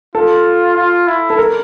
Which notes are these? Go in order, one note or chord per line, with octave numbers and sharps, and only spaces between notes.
F4 A4
F4
E4
A4
A#4